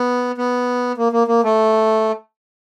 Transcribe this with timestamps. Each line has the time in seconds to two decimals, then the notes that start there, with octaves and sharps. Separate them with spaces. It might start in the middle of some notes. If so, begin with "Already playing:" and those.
Already playing: B3
0.38 B3
0.98 A#3
1.12 A#3
1.27 A#3
1.44 A3